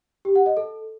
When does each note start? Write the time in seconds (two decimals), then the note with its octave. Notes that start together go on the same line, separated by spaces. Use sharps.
0.25 G4
0.36 F#5
0.46 D#5
0.57 A4